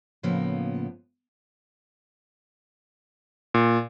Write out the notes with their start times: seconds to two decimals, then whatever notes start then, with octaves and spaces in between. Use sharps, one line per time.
0.23 A2 C#3 F3 A#3 B3
3.54 A#2